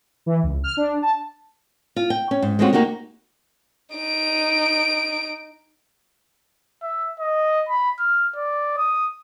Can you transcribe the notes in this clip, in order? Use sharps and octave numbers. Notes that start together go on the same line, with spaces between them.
E3
C#2
F6
D4
A5
F4
G5
C#4
G#2
G#3 A3 C4 C#4 F4 F#4
A#3 D#4 F#4 G4 A#4
D#4 D7
E5
D#5
B5
F6
D5
D#6